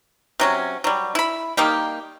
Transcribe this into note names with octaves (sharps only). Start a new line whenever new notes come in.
C3 F#3 C#4
F#3 G3
E4 B5
D#3 G3 A#3 G4